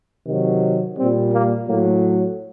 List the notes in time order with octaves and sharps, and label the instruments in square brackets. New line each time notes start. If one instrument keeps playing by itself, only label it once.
[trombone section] C3 D#3 F#3
A#2 G3 C4
A#3
A2 F#3 A#3